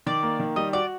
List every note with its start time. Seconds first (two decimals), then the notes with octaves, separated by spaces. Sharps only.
0.06 D#3 D5
0.23 A#3
0.40 D#3
0.56 G3 D#5
0.73 F#4 D5